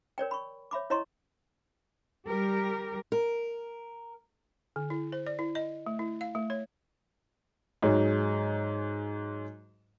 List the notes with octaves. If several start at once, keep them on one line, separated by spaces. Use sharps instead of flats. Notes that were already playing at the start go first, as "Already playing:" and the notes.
A#4 C#5 D5 G5
B5 C#6
C#5 E5 B5 D6
E4 C#5 D#5 A#5 C6 C#6
G3 G4 A#4
A#4
D3
E4
C5
D5
E4
D#5
A3
E4
F5
A3
C#5
G#2 F#3 G#3